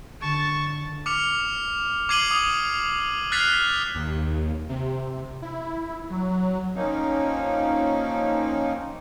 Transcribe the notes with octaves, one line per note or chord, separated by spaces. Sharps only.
D3 A5 C#6
D6 F6 C#7 F7
D6 G#6 C7 D#7 F#7 G7
D#6
F6 F#6 A6 B6 C7 F7
D#2
C3
E4
F#3
F3 A#3 C4 C#4 D#4